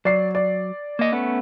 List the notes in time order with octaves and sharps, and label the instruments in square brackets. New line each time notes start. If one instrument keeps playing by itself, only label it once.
[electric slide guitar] F#3 [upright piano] D5 C7
[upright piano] D5
[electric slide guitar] A#3 D#5
A3 B3 C#4